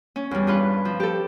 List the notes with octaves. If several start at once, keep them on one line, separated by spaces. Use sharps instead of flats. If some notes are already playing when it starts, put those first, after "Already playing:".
C#4
E2 G3
G2 F4 B4
F3
G4 A4